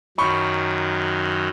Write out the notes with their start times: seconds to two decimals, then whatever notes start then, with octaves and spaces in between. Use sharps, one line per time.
0.18 F#2 D#3 F#3 B5 C#6